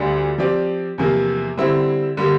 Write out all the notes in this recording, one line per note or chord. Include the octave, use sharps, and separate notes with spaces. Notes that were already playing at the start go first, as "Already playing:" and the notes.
Already playing: D2 D3 G3 D4
F3 C4 G4 D5
E2 C3 F3 A#3
D3 G3 C4 E4
D3 G3 A#3